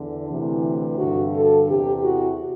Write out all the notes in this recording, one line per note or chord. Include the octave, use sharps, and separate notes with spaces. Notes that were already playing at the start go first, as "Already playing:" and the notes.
Already playing: E2 D3
D2 C3 E3
G2 D3 F#4
A4
E2 C3 E3 G4
F#4